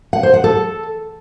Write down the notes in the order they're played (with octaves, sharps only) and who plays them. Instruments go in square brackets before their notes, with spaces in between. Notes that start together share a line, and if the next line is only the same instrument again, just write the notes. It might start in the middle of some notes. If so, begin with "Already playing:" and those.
[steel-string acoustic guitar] F#5
C5
F#5
A4